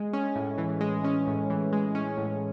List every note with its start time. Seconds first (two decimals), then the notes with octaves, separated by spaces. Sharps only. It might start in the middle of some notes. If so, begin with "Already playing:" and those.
Already playing: G#3
0.13 C#4
0.36 A2
0.58 E3
0.81 G#3
1.04 C#4
1.27 A2
1.50 E3
1.72 G#3
1.95 C#4
2.18 A2